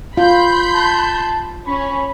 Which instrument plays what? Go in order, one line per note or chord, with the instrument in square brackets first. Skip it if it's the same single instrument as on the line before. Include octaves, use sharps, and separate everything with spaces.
[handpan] F4 [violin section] B5 C6 G6
[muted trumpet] A5
[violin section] C#4 [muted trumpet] B5